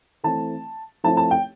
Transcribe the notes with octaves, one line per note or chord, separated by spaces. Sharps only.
E3 A3 C4 E4 A5
F3 A3 C4 E4 A5
A5
G5